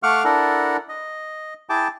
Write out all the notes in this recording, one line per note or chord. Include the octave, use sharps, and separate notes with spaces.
A3 F5 F#5 C#6 D6 F6
D4 E4 A4 A#4 F#5
D#5
E4 G#4 G5 A5 D6